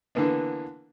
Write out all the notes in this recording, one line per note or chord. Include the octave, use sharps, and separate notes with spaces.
D3 E3 A#3 B3 D4